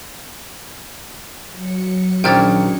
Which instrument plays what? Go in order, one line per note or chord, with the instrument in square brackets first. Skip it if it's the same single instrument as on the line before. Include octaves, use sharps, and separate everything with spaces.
[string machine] F#3 C#7
[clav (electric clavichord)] A#1 D#3 E4 [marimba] C#4 D4 [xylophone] G5 F6 A6